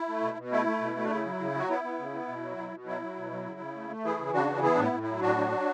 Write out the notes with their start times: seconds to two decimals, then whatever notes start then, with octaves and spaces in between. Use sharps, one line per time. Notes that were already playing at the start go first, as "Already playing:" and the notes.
Already playing: E4
0.08 A3
0.22 B2
0.37 B2
0.52 A3 E4
0.66 A3
0.81 B2
0.97 A3
1.04 D4
1.10 C#3 E4
1.26 F#3
1.40 C#3
1.55 F#3 F#4
1.69 B3 E4
1.84 B3
1.99 C#3
2.14 B3
2.28 B2
2.43 F#3
2.57 B2
2.72 B2
2.86 F#3 E4
3.02 F#3
3.16 B2
3.31 F#3
3.46 C#3
3.60 C#3
3.75 A3
3.90 A3
4.04 E3 E4 G#4
4.19 C#3
4.33 C#3 D4 F#4
4.48 E3
4.63 B3 E4 G#4
4.75 A2 D4
4.83 E4
4.93 A2
5.03 F#3 E4
5.21 A2 D4 F#4
5.37 F#3
5.52 F#3